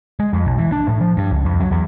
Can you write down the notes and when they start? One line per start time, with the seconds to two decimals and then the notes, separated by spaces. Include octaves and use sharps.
0.20 G#3
0.33 F2
0.46 B1
0.58 E3
0.72 D4
0.87 A2
1.01 F3
1.17 G2
1.32 C#2
1.45 F2
1.60 F#3
1.71 E2